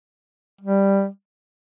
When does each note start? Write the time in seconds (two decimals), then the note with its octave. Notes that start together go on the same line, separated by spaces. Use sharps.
0.61 G3